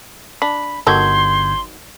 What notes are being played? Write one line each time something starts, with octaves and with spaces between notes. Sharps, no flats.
D4 B5
G1 D#3 F#3 A4 C6 G6 G#6